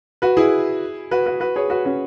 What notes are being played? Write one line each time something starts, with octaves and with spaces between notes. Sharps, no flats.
F#4 B4
E4 G#4
F#4 B4
F#4 B4
F#4 B4
G#4 C#5
F#4 B4
C#4 F#4